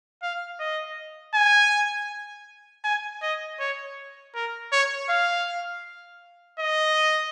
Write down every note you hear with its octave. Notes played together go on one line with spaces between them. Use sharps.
F5
D#5
G#5
G#5
D#5
C#5
A#4
C#5
F5
D#5